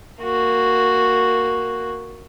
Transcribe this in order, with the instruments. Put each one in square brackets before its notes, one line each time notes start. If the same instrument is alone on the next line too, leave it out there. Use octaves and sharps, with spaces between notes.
[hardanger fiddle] A#3 F#4